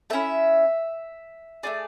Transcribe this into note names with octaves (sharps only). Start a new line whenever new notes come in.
A3 C#4 E4 E5
A3 E4 G#4 D5